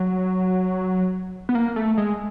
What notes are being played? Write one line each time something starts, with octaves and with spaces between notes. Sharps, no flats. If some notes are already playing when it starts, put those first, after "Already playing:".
Already playing: F#3
B3
A#3
A3
G#3